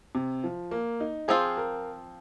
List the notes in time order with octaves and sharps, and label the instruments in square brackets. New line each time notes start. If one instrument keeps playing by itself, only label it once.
[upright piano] C3
F3
A#3
D#4
[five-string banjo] F3 C4 F4 [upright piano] G#4
[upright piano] A#4